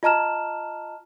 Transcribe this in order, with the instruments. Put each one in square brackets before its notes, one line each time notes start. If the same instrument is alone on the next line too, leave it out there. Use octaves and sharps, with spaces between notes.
[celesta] F4 D#5 A5 A#5 F6 E7